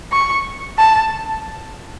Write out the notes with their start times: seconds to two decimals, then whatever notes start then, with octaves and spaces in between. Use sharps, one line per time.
0.12 C#6
0.78 A5